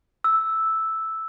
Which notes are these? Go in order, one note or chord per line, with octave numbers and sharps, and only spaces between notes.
E6